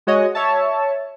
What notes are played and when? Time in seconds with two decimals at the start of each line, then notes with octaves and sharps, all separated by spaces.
0.07 G#3 F#4 C#5 D#5
0.35 C#5 E5 A5